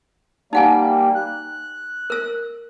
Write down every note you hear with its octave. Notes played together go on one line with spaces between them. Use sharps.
G3 A#3 D#4 F#5 G#5
F#6
A#4 E6